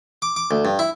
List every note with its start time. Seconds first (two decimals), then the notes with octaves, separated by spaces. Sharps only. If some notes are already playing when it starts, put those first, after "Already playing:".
0.22 D6
0.36 D6
0.51 D2
0.65 G2
0.79 E4